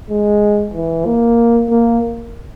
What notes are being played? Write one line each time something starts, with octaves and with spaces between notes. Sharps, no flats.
G#3
E3
A#3
A#3